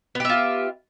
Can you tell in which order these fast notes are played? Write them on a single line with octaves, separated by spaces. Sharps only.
B3 G4 E5 F4